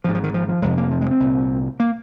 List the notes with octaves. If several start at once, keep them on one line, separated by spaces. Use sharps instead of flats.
G#1 G#2 F3
F3
D#3
F3
F3
F1 F2 C3 G#3
A#3
F3
G#3
C4
C2 A#2
A#3